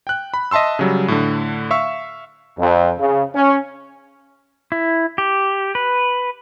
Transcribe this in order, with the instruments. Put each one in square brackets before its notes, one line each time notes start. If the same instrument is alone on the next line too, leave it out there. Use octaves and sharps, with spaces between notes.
[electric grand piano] G5 F#6
B5
D#5 E5 A5 C6 E6
C#3 F#3 G3
A2 D3
E5 F5 C#6 E6
[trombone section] F2
C#3
C#4
[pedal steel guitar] E4
G4
B4